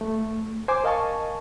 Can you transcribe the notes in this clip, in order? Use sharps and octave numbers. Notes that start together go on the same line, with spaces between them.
A3
C5 G#5 D6
A#4 D#5 F5 G#5 A5 C#6